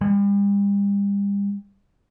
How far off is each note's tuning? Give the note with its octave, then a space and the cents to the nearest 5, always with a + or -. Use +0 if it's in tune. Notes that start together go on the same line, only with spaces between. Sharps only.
G3 +40